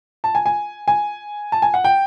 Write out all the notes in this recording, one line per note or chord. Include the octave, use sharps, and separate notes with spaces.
A5
G#5
G#5
G#5
A5
G#5
F#5
G5